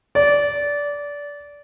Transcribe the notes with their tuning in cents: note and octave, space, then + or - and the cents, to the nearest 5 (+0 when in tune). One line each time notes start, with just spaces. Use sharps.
D5 -20